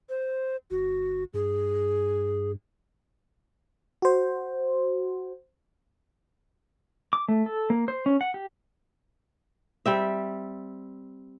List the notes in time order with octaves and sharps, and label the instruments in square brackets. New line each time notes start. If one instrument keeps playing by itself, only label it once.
[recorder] C5
[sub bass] G1 [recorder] F#4
[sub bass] G2 [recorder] G#4
[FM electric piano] F#4 C5
[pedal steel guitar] D6
A3
A4
A#3
C5
C#4
F#5
G4
[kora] G3 C4 E5